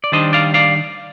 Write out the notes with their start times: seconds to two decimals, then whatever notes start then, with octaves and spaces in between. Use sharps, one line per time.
0.04 D5
0.12 D#3 G3 D4 C5 D#5
0.33 D5 F5
0.54 D5 F5